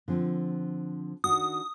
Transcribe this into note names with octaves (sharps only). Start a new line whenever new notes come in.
D3 F3 C4
D#3 D4 F#4 D#6